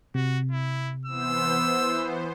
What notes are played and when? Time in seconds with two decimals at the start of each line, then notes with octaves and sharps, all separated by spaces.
0.15 C3 F#4
0.52 E4
1.06 E3 B3 C5 E6